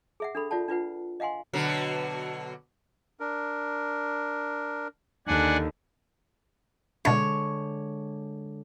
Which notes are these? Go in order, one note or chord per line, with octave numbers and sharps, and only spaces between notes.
G#4 E5 F#5
D4 A4 B5
F4 D5 F#5 A5
D4 F4 B4 F#5
D#5 F5 F#5 G#5 C6
B2 D3 F#3
D4 A#4
D#2 D3 D4 F#5 G#5
B2 D3 G#3 D4 E4 C#5